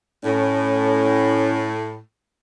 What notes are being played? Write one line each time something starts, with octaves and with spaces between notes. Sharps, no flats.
A2 C#4